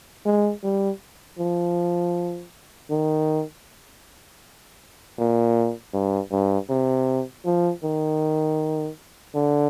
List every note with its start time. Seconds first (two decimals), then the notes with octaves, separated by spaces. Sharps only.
0.26 G#3
0.64 G3
1.39 F3
2.90 D#3
5.19 A#2
5.94 G2
6.31 G2
6.70 C3
7.45 F3
7.84 D#3
9.35 D3